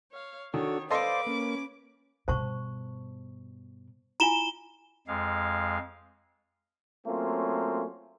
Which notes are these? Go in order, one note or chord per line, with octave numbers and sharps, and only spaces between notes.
C#5 F5
D#3 D4 F#4 A4 C#5
A4 B4 C5 D5 D#5 F5 C6 D6
A#3 C#4
G2 B2 C5 A5 C#6
E4 F4 G#5 A#5 E7 G7
F2 G#3 F5
F#3 A3 A#3 C4 C#4 F4